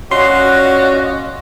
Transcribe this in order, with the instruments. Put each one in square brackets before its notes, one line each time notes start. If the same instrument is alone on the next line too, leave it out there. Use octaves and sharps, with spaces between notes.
[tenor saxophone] C#4 [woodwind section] F4 D5 D#5 [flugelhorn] F#4 [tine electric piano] C6